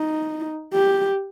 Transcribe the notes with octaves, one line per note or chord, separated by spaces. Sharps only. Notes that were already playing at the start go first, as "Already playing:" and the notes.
Already playing: D#4
G4